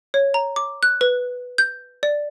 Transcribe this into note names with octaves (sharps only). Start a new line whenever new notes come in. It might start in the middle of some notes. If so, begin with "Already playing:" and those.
C#5
A#5
D6
F#6
B4
G6
D5